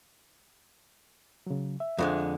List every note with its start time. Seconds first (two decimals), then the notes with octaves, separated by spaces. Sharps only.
1.47 C#3 F#3
1.80 E5
1.98 F2 D3 G#3